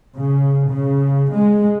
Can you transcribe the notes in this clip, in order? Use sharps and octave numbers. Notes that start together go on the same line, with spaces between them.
C#3
C#3
G#3